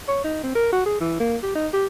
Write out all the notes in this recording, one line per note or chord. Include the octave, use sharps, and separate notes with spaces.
C#5
D#4
C4
A#4
F#4
G#4
E3
A#3
G4
D#4
G4